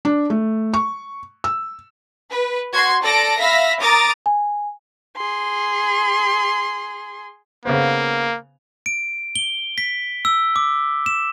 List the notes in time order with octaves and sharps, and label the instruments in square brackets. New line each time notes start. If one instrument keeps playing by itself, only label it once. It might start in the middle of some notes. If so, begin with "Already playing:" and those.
[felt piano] D4
A3
C#6
E6
[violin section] B4
F#4 C6 G#6
A4 D5 A5 A#6 D7
E5 F5 B5 A#6 B6
A#4 A#5 D6 D#6 A6
[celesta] G#5
[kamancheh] G#4 C6
[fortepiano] C#3 B3 C5 [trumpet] A#3
[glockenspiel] D7
G7
B6
E6
D6
E7